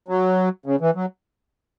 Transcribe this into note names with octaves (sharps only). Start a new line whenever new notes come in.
F#3
C#3
E3
F#3